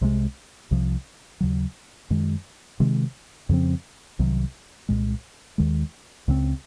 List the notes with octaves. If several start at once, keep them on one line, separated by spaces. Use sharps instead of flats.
C2 C3 F3 G#3
C2 C3 F3
D#2 C#3 F#3
F#2 D#3 G#3
C3 D#3 G#3
F2 C#3 F3 C4
C2 C3 D#3 F#3
C2 A#2 G#3
D#2 D#3 G#3
C#2 C#3 F#3 C4